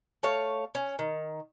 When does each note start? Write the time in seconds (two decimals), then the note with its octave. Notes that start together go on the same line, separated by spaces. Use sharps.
0.23 A3 C#5 F5
0.75 C#4
0.99 D#3